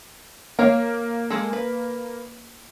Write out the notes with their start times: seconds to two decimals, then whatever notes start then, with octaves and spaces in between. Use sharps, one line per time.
0.59 A#3 A#4 C#5 F5
1.30 G#3 G#4 A4
1.53 B4